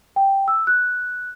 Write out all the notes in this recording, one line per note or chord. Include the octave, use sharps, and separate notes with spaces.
G5
E6
F#6